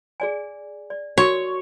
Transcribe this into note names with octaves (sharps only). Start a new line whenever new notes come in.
G#4 D5 G#5
D5
F#4 A#4 C#5